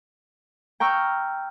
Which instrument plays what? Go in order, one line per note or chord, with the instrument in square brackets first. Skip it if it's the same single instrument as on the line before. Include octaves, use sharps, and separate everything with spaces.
[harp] G5 A#5 C#6 E6 F6